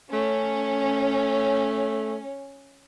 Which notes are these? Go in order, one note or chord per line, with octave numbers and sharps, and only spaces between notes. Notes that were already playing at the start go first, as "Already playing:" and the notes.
A3 C#4